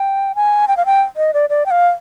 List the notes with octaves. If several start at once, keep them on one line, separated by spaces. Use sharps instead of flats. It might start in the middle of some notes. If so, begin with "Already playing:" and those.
Already playing: G5
G#5
G5
F5
G5
D#5
D5
D5
G5
F5